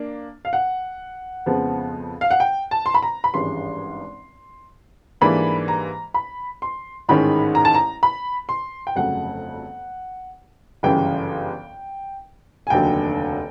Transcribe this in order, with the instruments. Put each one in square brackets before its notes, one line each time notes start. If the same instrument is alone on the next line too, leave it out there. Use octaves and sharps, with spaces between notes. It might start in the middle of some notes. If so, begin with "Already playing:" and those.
Already playing: [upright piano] A#3 D4
F5
F#5
F2 C#3 F3 G#3 B3
F5
F#5
G5
A5
C6
B5
A#5
B5
G#1 G2 E3 G#3 C#4 C6
G#2 E3 G3 A#3 D4 B5
A#5
B5
C6
A1 G#2 D#3 G#3 C#4 B5
A#5
A5
A#5
B5
C6
G5
G1 F2 C#3 F#3 A3 F#5
G1 F#2 C#3 E3 G3 G5
G#5
F1 D#2 D3 F#3 G5